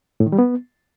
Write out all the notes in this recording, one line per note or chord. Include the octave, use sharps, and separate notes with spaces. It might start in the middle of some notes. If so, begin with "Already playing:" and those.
A2
D#3
G3
B3